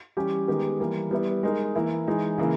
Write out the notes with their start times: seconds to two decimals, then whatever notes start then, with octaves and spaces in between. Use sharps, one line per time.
0.17 E3 G3 C#4 G4
0.48 D#3 G#3 B3 G4 A#4
0.80 E3 G3 A#3
1.11 G3 B3 E4
1.43 G#3 D#4 A#4
1.75 E3 A#3 E4
2.07 E3 G#3 D#4
2.38 C#3 E3 A#3 E4